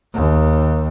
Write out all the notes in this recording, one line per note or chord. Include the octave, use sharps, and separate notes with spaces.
D#2